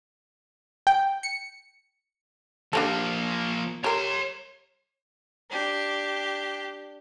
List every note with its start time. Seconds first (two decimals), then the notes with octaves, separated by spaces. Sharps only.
0.87 G5
1.23 C#7
2.73 F3 A#3 D4 G4 A4
3.84 G4 A#4 C#5 C6
5.50 D4 G4